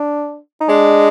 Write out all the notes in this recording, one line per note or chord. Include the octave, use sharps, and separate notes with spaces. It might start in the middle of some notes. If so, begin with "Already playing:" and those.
Already playing: D4
D#4
G#3 D4